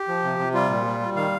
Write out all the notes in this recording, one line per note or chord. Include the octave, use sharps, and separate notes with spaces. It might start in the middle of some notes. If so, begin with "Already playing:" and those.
Already playing: G4
F3
C3
C3
G3 F4
A#2
G3
G3
D#3 F5